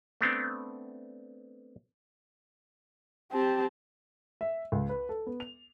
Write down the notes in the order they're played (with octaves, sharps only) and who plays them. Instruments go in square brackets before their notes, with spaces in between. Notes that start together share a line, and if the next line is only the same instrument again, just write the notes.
[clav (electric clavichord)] A3 B3 C4 D4
[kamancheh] C4 [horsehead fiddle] G4 A5
[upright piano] E5
C#2
B4
A4
B3
F7